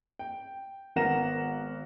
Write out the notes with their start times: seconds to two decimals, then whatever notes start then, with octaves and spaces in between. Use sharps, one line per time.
0.19 G5
0.96 G#1 B3 A#4 F#5 A#6 E7